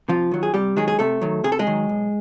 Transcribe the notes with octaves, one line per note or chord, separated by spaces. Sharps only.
C3 F3 F4
D#3 F#3
G#4
C3 G3 G4
D#3 F#3 G#3 G#4
G#4
C3 A3 A4
D#3 F#3
C3 G#4
A4
G#3 G#4
D#3 F#3
B1